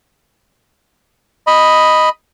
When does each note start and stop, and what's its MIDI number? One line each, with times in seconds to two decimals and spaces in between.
1.47 2.09 75
1.47 2.09 83